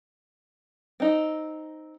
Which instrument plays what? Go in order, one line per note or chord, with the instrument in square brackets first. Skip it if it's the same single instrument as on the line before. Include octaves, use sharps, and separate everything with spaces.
[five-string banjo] C4 D#4